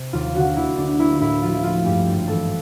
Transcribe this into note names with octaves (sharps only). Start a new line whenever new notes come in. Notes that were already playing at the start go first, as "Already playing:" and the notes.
Already playing: C3
D#2 F4
D3 F#4
A#3 E4
D2 D4
A#3 E4
A2 E4
F3 F4
E4
A3 F4
G2 G4
G#1
E3 A4